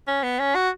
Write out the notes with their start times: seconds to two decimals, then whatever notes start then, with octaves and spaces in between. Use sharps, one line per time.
0.08 C#4
0.23 B3
0.39 C#4
0.55 F#4